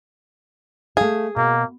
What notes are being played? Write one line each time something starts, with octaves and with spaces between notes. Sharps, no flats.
A3 G#4 F5
B2 A#3